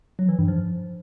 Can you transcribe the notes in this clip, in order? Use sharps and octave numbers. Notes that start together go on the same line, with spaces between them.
F#3
E3
G2
F3